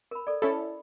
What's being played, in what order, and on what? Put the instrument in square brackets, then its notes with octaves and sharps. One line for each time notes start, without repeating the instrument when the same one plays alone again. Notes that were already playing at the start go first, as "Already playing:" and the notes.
[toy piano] A#4 B5
A4 D5
[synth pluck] C#4 E4 A4 [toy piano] B5